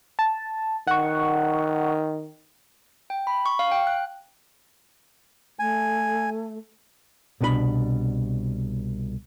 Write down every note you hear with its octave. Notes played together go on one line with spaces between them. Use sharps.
A5
D#3 F#5 C#6
G5
B5
C#6
F5
G5
F#6
A3 G#5
C2 B2 D4 G4 B5